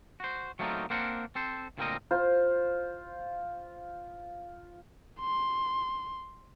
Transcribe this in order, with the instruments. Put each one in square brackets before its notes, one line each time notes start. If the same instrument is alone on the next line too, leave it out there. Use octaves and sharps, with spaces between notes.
[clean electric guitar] F#4 C5
F#3 A3 A#3 C4 D#4 F4
A#3 C4 D4 A#4 C5 F#5
C4 A4 C5
D2 A#2 G3 C4 A#4 D#5
[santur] F4 C5
[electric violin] C6